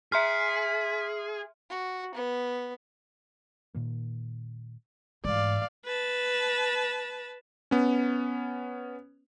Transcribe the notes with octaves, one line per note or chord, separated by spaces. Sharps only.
G#4 E5 C6 F6 B6
F#4
B3
A#2 D#3 A#3
G#2 E3 G#3 A3 D5 F5
B4 A5
B3 C#4